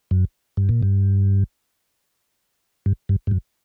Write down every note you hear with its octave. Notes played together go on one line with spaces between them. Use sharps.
F#2
G2
A#2
G2
G2
G2
G2
F#2